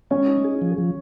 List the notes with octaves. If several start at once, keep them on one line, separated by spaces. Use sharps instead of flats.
G#3 C#4
D#4
G#4
F3
F3